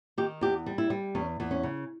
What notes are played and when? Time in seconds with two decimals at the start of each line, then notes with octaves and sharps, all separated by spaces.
0.18 D#3 G4
0.41 E2 G4
0.66 G3
0.78 E4
0.90 G3
1.15 E2 C#4
1.40 E2
1.51 C#4
1.63 C#3